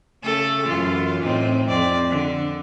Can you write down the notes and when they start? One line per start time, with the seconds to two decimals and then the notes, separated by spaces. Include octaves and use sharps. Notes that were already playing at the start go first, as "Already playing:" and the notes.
0.23 C#3 A3 A4
0.66 F#2 E3 F4
1.23 A2 C4 D#4
1.68 F2 C4 D5
2.10 D3